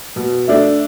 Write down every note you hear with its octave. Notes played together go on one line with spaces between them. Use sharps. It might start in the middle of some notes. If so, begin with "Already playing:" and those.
B2
A3 D4